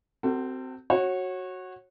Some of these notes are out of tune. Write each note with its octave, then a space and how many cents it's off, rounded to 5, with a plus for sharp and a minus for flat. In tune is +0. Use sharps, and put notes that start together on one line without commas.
C4 -10 F#4 +30 A4 +35
F#4 +0 C#5 -25